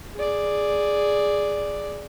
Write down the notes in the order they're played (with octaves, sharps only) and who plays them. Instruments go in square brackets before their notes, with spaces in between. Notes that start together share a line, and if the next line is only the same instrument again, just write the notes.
[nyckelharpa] G#4 D5